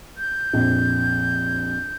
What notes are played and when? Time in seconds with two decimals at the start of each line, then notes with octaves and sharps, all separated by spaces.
0.18 G6
0.53 A#1 F2